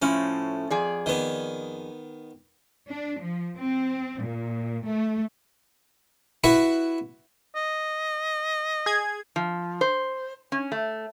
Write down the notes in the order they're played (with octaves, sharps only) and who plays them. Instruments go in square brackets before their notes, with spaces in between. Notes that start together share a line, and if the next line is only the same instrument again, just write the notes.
[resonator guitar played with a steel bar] A2 F3 A3 [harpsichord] C#4
[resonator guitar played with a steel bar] F2 G#4 D5
[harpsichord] D#3 B3
[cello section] D4
F3
C4
A#2
A3
[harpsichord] E4 F#4 B4 F#5
[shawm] D#5
[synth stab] G#4 G#6
[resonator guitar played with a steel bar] F3
C5
C#4
A3